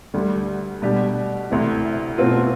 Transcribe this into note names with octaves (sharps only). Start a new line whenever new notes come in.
D2 D3 G3
B2 G3 D4 G4 D5
D2 C3 E3
B2 A3 C4 F4